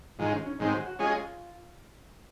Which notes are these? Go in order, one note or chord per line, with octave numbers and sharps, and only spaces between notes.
G#2 D#3 G#3 F4
C#4
C#4
G#2 D#3 G#3 C4 D#4
F#4
F#4
G#3 C#4 F4 G#4 D#5